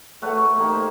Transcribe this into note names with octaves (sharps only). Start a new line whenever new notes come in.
A3 F#4 B4 C#5
A#4
A3 A#3 D#4 G4
C5 F5